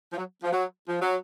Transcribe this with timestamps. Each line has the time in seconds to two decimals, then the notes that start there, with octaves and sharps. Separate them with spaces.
0.13 F3
0.17 F#3
0.43 F3
0.52 F#3
0.88 F3
1.01 F#3